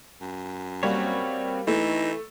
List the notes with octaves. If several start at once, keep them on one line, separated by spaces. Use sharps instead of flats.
F#2
G3 A#3 C4 F#4 C#5
E3 A3 D#4